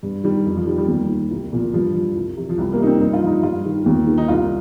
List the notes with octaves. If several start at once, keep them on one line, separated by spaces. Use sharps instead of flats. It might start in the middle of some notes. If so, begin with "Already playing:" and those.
G2
D#3 G3
F2
F3
D#3 G3
G3
D#2 G3
D#3
C2
A#2 F3
G2 F3
F3
C2
C3 F3
F3
C2 G3
A#3
C3 F3 D#4
C4
G2 D#4
F4
F3 D#4
G2 F4
D#3
D#2
D#3
D#4
C2 F4